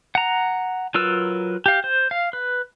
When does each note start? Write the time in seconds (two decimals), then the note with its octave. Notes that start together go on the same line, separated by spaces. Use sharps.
0.15 F#5 A#5
0.94 F#3 F4 A#4 B4 E6
1.66 G4 F5
1.84 C5
2.11 F5
2.33 B4